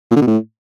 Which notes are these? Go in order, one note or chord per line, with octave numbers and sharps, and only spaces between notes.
A#2
D3
B2
A2